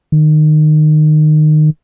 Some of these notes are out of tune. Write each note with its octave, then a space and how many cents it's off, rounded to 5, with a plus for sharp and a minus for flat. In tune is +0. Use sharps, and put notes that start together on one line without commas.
D#3 -25